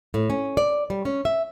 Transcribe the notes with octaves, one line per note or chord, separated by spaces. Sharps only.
A2
C#4
D5
G3
C#4
E5